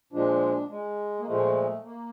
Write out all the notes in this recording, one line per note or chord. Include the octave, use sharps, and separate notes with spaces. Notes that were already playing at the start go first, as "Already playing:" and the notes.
A#2 F3 G#3 D4
G#3
A#3
A#2 F3 G#3 A3
A#3